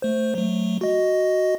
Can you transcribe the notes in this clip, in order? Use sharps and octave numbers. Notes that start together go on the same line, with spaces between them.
A3 C5
F#3 A3
F#4 D#5